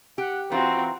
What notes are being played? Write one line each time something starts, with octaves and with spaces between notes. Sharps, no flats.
G4 F#5
E3 C4 F4 F#4 A#5